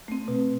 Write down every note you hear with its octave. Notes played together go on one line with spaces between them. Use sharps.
A3 C4
B2